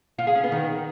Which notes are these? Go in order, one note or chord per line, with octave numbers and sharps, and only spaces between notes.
F4
G#4
C#4
B3
D#3